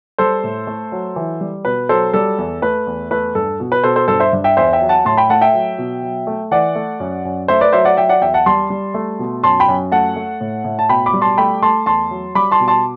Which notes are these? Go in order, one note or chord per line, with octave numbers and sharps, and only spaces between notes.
G3 A4 C5
A2
A3
F#3
E3
G3
B2 B4
F#3 A4 C5
G3 A4
E2
A3 B4
E2
A3 B4
G2 A4
B2
B4
B2 A4 C5
A4 C5
G2 A4 C5
C5 E5
G2
E5 G5
E2 C5 E5
E5 G5
F#3
F#5 A5
A2 A5 C6
G5 B5
A3 F#5 A5
E5 G5
F#3
B2
F#3
A3
E3 D5 F#5
A3
F#2
F#2
A3 C5 E5
B4 D5
F#3 C5 E5
D5 F#5
F#3 E5 G5
D5 F#5
E2 E5 G5
F#5 A5
G3 A5 C6
G3
A3
B2
F#2 A5 C6
G5 B5
F#2
A3 F#5 A5
A3
A2
A2
A5
B2 G5 B5
B5 D6
G3
A5 C6
A3 G5 B5
A3 A5 C6
E2 A5 C6
F#3
G3 B5 D6
A5 C6
B2
A5 C6